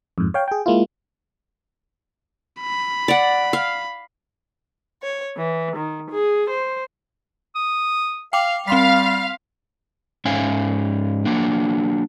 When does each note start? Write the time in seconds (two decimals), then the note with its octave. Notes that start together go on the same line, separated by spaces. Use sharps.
0.18 F2 G#2
0.34 C#5 F5 G5
0.48 G#4 G5
0.66 G#3 A#3 E4 F4
2.60 B5
3.08 D5 F#5
3.53 F5
5.02 C#5
5.37 E3
5.76 D#3
6.11 G#4
6.49 C5
7.56 D#6
8.33 F5 G5 D6 F7
8.68 G3 C4 F5 C6 B6
10.25 G#2 C#4 E5 F5 G#5
11.25 F#3 A#3 D4